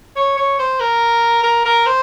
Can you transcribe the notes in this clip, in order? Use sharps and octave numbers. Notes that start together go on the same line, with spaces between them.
C#5
C#5
C5
A#4
A#4
A#4
C5